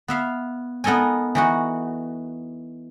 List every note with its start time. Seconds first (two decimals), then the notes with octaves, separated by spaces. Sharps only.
0.08 B3 E5 F5
0.84 B3 D#4 A4 A#4 G#5
1.35 E3 D#4 F#4